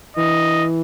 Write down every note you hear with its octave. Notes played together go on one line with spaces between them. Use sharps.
E3 D#5